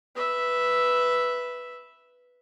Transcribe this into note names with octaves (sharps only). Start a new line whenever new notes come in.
B4 E5